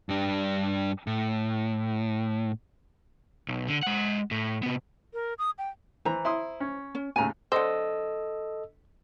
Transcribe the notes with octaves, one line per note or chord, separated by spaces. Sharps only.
G2 D4
A2
B1
D3
G#3 F#5
A2
C3 B3
A#4
D#6
G5
E3 C5 A#5
E4 C6 D#6
C#4
C#4
D#2 A2 C#3 G#5 A#5
D3 A4 C5 D#5 E6